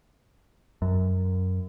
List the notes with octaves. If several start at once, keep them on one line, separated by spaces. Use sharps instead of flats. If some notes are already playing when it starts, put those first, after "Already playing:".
F#2